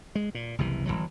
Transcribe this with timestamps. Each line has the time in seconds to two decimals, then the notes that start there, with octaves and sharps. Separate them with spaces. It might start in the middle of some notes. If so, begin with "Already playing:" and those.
0.15 G#3
0.35 A#2
0.58 F#1 C2 C3 E3
0.86 G1 C#2 E3 F#3